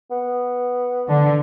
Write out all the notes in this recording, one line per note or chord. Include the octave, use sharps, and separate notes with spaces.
B3
D3 D4